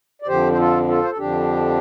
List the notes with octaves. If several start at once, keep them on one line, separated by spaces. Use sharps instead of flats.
D5
F2 D3 F3 G4 C5
C5
F4 A4
F4 A4
C5
A4
F2 D3 F3 D4 G4